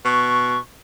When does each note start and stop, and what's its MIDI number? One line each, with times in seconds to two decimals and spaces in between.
0.05 0.57 47
0.05 0.58 85